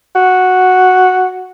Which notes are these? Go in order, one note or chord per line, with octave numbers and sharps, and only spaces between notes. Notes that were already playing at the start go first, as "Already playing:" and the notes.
F#4